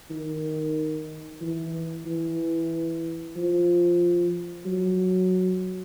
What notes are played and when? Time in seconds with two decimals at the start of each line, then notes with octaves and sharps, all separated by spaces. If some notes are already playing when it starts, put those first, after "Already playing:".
0.10 D#3
1.41 E3
2.06 E3
3.36 F3
4.65 F#3